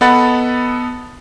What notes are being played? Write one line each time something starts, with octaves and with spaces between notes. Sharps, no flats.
B3 A4 D#5 F#5 B5 A6